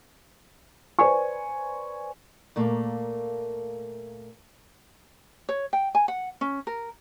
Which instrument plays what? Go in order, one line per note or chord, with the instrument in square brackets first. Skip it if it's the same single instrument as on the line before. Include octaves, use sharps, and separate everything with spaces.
[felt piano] B4 C5 D5 G#5 C#6
[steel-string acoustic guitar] A#2 A3 A#3
[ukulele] C#5
G5
G#5
F#5
C#4
A#4